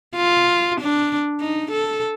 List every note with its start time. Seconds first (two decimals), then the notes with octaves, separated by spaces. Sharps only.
0.16 F4
0.80 D4
1.40 D#4
1.71 A4